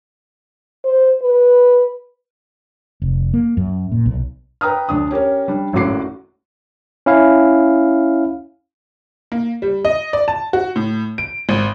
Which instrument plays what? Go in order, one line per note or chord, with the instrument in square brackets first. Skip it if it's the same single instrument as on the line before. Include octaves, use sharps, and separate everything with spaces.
[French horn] C5
B4
[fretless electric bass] F1
A#3
F#2
A#2
B1
[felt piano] B4 G5 A#5 D#6 F6
D2 D4 D#6
C#4 G4 A#4 C#5
G3 D4
G#1 F#2 A2 F#4 D6 C7
[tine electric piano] C#4 E4 F5
[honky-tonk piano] A#3
G3
D#5
D5
A5
F#4
A2
D7
G#1